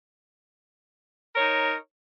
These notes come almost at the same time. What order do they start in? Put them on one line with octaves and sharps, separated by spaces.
A#4 C#5 D#4